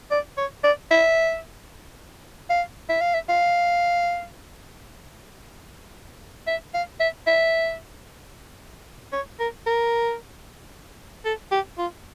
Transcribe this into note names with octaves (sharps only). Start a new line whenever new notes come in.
D5
C#5
D5
E5
F5
E5
F5
E5
F5
E5
F5
E5
E5
C#5
A#4
A#4
A4
G4
F4